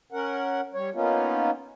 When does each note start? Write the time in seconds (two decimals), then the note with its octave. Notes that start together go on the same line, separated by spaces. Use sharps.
0.12 C#4 A#4 F#5
0.74 G3 C#5
0.94 A#3 B3 C#4 D#4 F4